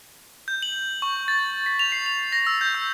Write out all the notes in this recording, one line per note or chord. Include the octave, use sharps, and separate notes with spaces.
G6
F#7
C#6
A6
B6
F7
C7
F7
A#6
E6
G6
E6